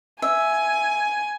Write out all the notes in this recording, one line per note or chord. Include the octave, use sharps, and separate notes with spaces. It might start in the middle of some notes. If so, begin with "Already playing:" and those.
E5 G#5